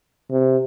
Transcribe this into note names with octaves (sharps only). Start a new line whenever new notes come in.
C3